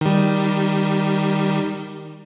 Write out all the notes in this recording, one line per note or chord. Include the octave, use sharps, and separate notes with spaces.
D#3 G3